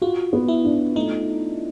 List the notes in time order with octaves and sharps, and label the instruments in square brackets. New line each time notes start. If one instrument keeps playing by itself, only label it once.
[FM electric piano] F4 [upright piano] F#4
[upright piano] B3
[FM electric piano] E4
[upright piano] D4
[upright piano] A3 [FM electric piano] D#4